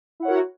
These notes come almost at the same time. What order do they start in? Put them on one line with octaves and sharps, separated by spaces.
E4 F#5 C#5 A#4 F#4